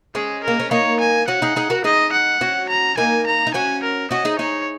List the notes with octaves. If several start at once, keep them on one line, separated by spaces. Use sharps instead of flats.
G#3 C#4 G#4
A#3 A#4
C#4
A#3 D#4 C#5
G#5
C#4 F#4 F#5
D#4 G#4
D#4 G#4
F#4 A#4
D#4 G#4 D#5
F#5
C#4 F#4
A#5
A#3 D#4 G#5
A#5
D#4
C#4 F#4 G#5
A#4
C#4 F#4 D#5
D#4 G#4
D#4 G#4 C#5